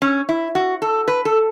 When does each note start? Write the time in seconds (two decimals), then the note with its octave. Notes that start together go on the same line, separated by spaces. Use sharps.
0.02 C#4
0.29 E4
0.55 F#4
0.82 A4
1.08 B4
1.25 A4